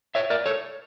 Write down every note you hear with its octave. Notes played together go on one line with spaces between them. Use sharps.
C#5 E5
A#4 D5
A4 C#5